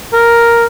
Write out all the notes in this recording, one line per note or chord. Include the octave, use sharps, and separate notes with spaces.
A#4